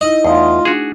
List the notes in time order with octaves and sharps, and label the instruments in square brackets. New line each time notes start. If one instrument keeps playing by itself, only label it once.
[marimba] D#4 E4 [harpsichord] D#5
[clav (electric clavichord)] E2 [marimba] A3 D#4 [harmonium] F4
[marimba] D4 [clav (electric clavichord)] F#4 G#4